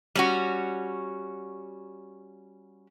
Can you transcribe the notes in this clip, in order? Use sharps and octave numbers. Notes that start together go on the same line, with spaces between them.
G3 C#4 F#4